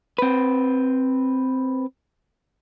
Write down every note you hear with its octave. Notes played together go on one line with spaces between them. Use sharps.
C4 B4